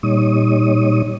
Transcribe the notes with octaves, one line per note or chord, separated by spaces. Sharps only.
A#2 G3 D#4 C#5 D#6